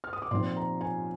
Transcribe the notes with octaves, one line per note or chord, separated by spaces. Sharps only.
F6
D#6
D6
A#2 F3 C4 D#4 C6
A#5
G#5